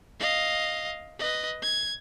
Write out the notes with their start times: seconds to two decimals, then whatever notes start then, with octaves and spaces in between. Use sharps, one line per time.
0.20 D#5 F5
1.19 B4 D#5
1.62 G#6